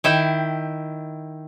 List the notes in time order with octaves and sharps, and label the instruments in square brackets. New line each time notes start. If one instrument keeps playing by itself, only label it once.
[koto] D#3 E4 E5 G5